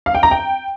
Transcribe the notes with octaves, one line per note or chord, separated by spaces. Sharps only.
F5
G5
A#5
G5